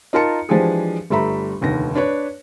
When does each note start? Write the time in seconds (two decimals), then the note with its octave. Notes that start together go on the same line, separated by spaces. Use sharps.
0.13 D#4 F4 A#4 A5 C#7
0.49 E3 F3 G#3 D4 G4 G#4
1.10 G1 G3 A3 E5 A#5 B5
1.61 F1 D#2 D3 A#6
1.95 D4 B4 C#5